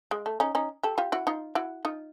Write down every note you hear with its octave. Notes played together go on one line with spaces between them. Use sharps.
G#3
A3
C#4 D#4
C#4 D#4
G4 A4
F4 G4
E4 F#4
D#4 F4
E4 F#4
D#4 F4